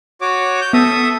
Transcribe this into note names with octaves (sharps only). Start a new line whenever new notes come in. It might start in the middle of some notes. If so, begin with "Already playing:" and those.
F#4 C#5 D6
G6
B3 A4 E5 D#6